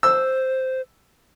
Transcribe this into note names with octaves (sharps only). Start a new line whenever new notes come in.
C5 E6